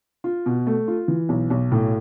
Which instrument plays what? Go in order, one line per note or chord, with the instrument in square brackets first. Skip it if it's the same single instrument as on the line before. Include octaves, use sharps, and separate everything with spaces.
[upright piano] F4
B2
A3
F4
E3
B1
B1
A2